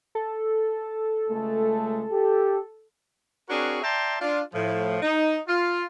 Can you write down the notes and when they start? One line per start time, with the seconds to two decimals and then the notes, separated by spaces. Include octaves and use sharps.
0.15 A4
1.30 C#2 G#3 A3
2.11 G4
3.49 C4 D4 F#4 G#4 A#4 C#5
3.82 D5 E5 G5 A5 A#5 C6
4.20 D4 F4
4.53 A2 F3
5.02 D#4
5.47 F4